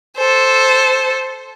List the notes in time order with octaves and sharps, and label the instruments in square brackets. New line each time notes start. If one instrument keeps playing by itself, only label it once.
[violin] A4 C5